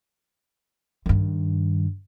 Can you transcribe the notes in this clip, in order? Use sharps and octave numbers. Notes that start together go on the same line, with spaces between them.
G2 D#3